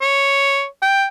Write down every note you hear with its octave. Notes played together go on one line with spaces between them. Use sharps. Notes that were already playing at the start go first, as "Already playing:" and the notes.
C#5
G5